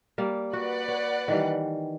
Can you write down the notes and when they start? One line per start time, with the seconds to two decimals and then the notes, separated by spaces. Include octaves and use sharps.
0.18 G3 A#3 D5
0.53 F#4 B4 D5 F#5
0.88 C#5
1.28 D#3 E3 G3